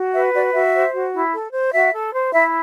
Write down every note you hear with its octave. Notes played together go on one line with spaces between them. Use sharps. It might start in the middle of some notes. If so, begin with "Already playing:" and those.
Already playing: F#4
B4 E5
F#4 D5
F#4 E5
C5
F#4
E4
A4
C5
F#4 E5
A4
C5
E4 E5